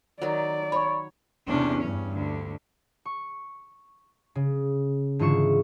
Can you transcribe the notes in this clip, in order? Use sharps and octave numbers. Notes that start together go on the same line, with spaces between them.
D#3 F#3 D5
C#5 B5 C#6
E2 C3 C#4 D4
G2 C#4
D2 D3
C#6
C#3
G#2 D3 E3 F4 C#6 E7